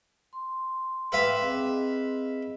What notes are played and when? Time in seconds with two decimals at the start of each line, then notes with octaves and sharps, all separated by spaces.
0.33 C6
1.12 B4 E5 F5 G5 C6 D6
1.42 C4 G#4 D#5